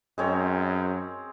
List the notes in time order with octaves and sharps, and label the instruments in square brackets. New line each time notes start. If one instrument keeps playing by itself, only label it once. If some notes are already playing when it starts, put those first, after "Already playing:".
[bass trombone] F#2 [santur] G#3 C4 C#5